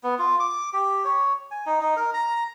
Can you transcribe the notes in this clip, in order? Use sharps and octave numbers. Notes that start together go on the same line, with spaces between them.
B3
F4
D6
G4
C#5
G#5
D#4
D#4
A#4
A#5